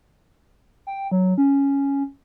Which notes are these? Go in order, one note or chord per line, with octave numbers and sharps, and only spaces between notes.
G5
F#3
C#4